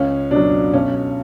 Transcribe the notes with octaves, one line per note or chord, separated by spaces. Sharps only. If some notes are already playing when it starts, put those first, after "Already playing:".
Already playing: C#2 C#4
B2 F#3 D4
B1 C#4